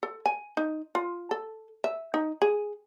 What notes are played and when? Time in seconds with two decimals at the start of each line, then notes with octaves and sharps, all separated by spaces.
0.03 A4
0.26 G#5
0.57 D#4
0.95 F4
1.31 A4
1.84 E5
2.14 D#4
2.42 G#4